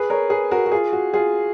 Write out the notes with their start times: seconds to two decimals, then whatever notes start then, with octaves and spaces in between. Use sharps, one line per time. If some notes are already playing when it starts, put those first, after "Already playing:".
Already playing: G#4 B4
0.10 A#4 C#5
0.30 G#4 B4
0.51 F#4 A#4
0.66 F#4
0.72 F4 G#4
0.93 F#4
1.14 F4 G#4